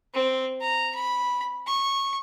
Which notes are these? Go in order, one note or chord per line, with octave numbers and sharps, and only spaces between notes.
C4
A#5
B5
C#6